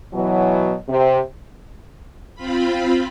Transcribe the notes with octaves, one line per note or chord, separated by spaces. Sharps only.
B2 E3 F#3
C3
C4 F4 B5